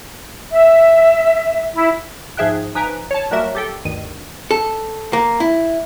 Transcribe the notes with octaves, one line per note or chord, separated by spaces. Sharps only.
E5
E4
G#2 F3 G#4 E5 G5 F#6
F3 D#4 B4 G#5 A#5 D7
C#5 A5
F#3 G3 A#3 F#4 A#4 E5
G4 A4 G5
D2 G2 D#3 D#7
A4
A#3
E4